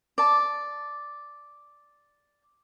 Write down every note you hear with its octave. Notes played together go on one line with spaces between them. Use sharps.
D5 A5